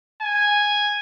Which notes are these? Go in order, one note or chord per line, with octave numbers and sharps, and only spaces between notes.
G#5